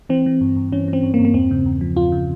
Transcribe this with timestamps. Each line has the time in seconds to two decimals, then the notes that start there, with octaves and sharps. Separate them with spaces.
0.09 E3 C4
0.26 E3
0.41 G2
0.56 G2
0.72 E3 C#4
0.88 E3
0.93 C4
1.03 G2
1.14 A#3
1.19 G2
1.25 A#3
1.34 E2 C4
1.51 C#3
1.66 E2
1.81 F3
1.97 E2 F4
2.12 C#3